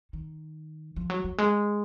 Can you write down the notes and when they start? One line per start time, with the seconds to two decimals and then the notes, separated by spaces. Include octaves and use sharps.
0.13 D#3
0.96 F3
1.10 F#3
1.24 F#3
1.38 G#3